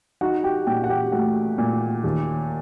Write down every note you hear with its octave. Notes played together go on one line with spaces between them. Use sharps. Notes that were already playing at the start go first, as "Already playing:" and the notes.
D#4 F#4 F#5
G4 G5
A#2 G4 G5
F#5
G4 G5
A3 F#4 F#5
A#2
D#2